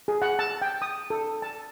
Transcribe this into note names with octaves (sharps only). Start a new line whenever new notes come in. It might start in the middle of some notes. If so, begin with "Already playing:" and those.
G#4
F#5
A5
G5
D#6
A4
A5